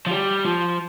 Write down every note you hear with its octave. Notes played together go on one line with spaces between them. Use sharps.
F3
G3
F3